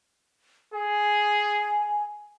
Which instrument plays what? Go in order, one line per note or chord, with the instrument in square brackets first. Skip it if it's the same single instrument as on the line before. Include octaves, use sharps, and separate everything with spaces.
[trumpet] G#4 [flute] G#5